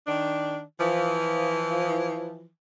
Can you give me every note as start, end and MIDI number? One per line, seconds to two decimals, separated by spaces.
0.07 0.61 51
0.07 0.61 62
0.79 2.47 52
0.79 2.47 53